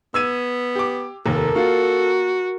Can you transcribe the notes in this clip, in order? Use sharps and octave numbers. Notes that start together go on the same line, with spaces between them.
B3 E6 G#6 D#7
G4 D6
F1 D#2 A4 A#4
A#3 F4 F#4